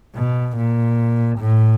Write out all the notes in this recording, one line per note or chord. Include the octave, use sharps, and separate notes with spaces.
B2
A#2
A2